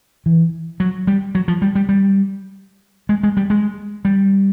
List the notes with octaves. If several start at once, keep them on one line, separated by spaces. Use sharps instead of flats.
E3
F#3
G3
F#3
F3
G3
G3
G3
G#3
G#3
G3
G#3
G3